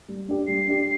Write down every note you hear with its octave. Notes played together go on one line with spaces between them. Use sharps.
G3
D4 G4
G3 C7
D4 G4